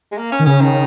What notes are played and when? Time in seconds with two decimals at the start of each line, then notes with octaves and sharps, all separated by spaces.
0.12 G#3
0.18 A#3
0.32 C#4
0.39 D#3
0.46 C#3 C#4
0.61 D#3